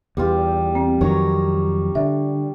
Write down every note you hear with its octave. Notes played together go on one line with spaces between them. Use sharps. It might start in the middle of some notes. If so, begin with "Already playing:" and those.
E2 G3 F4
C4
F2 D#3 F#3 C#5 A#5
D3 E5